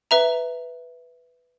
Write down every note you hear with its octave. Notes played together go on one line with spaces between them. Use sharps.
B4 E5 A#5